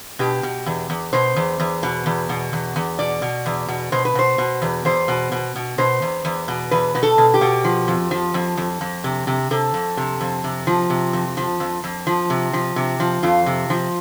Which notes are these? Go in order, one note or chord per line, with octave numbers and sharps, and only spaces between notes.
B2 G4
B2
E2
E2
B2 C5
E2
E2
B2
E2
B2
E2
E2
B2 D5
B2
E2
B2
B2 C5
B4
B2 C5
B2
E2
E2 C5
B2
B2
B2
B2 C5
E2
E2
B2
E2 B4
B2 B4
A4
B2
G4
B2
F3
F2
F3
F2
F2
F2
C3
C3
C3 A4
F2
C3
F2
C3
F3
C3
F2
F3
F2
F2
F3
C3
F3
C3
F3
F2 F4
C3
F3